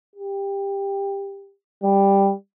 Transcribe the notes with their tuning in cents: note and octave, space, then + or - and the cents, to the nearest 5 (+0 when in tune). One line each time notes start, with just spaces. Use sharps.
G4 +15
G3 +10